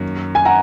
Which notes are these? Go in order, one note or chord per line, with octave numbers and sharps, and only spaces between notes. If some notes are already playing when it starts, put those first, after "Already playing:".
Already playing: F#2 D#3 F#3 A#3
G#5
F#5 A#5